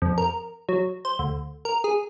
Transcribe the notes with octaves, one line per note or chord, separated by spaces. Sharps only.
F2
A#4
F#3
C5
D2
A#4
G#4